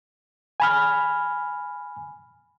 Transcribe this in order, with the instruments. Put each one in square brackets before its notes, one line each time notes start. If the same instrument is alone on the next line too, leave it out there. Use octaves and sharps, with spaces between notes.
[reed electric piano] G#5 B5 F6